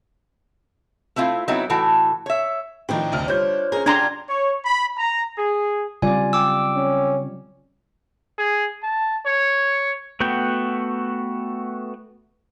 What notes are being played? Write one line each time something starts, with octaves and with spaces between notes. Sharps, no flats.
A3 C4 E4 F4
F#3 B3 C4 D#4 E4
A2 E3 F#4 A4
C#5 E5
A2 D#3 F3 C4 D4 D#4
F1 D2 F6
G3 D4 F4 C5 C#5 G6
C#4 G#4 A#4
D3 G3 D4 F4 A#5 C6 G#6
C#5
B5
A#5
G#4
C#3 F#3 G3 C4 F4 D5 G#5
G5 D6 E6
C#4
G#4
A5
C#5
A3 B3 F#4 F#5 G5